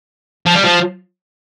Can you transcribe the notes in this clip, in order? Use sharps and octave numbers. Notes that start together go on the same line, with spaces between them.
F3
G3
F3